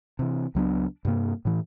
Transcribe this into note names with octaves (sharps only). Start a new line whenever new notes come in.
C3 E3
C#2 F#3 B3 D4
G2 C3 A#3
A2 E3